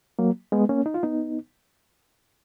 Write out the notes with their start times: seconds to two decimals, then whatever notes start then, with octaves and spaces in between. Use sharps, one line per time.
0.19 F#3 A#3
0.52 G#3 B3
0.69 A#3 C#4
0.86 D#4
0.94 F4
1.03 B3 D#4